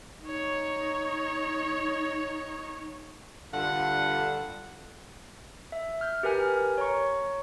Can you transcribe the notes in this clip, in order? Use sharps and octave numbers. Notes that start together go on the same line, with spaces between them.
D#4 C#5
G2 D3 D4 F4 F#5
E5
F6 G6
G4 A#4 B4 G#5 F6
C#5 A#5 C#6